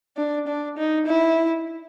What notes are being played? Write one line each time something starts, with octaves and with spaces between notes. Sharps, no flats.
D4
D4
D#4
E4